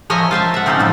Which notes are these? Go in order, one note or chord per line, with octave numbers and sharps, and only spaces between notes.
F3 C#5 D#5 E5 G#5 A#5
F4 C5 E5 A5
E5 F#5
C4 C#4 D#4 F4 G4 A4
A2 F3 A#3